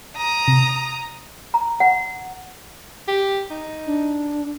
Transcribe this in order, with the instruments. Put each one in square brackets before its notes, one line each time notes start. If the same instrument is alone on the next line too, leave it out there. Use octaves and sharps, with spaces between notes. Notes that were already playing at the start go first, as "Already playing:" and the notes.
[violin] A#5 D#6
[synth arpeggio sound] C3
[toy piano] A#5
F#5
[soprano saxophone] G4
D#4
[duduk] D4